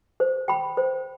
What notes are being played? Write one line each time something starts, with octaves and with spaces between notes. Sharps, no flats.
C5
G5 B5
C5